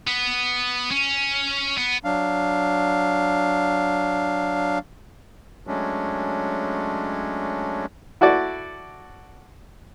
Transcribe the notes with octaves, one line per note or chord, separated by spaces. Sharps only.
B3
C#4
B3
F#3 D4 F5
F#3 G#3 A3 C#4 D4
E4 F#4 A4 D5